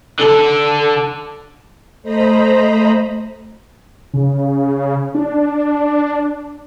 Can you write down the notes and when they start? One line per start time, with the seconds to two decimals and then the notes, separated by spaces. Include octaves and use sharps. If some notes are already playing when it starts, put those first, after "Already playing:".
0.19 D3 A4
2.03 A3 C5 D#5 A#5 B5
4.14 C#3
5.15 D4